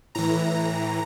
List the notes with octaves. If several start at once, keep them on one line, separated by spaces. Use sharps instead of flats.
A2 E3 A#5